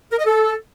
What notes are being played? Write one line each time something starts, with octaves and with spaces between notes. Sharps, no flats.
A#4
D#5
A4